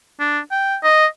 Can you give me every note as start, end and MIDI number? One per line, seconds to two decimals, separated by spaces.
0.20 0.39 62
0.51 0.76 79
0.84 1.06 75